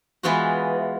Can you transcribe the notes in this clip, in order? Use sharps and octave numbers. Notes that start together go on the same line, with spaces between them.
E3 G#3 B3 F4 F#4